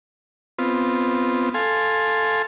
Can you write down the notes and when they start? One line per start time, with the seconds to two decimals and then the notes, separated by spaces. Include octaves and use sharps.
0.59 B3 C4 F4
1.54 A4 F5 G#5 C6